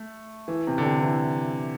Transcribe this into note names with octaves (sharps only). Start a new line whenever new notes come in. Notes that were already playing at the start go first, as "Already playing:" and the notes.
Already playing: A3
E3
C3
D3
C3
E3